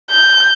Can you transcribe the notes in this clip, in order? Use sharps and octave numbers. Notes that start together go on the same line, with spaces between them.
G6